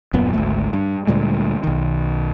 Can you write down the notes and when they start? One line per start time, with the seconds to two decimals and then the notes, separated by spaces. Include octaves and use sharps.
0.13 D#1 F#2 A#2 B3
0.33 G#1 D2 A3
0.73 G2
1.07 D2 A#2 G3 G#3
1.64 B1 D#3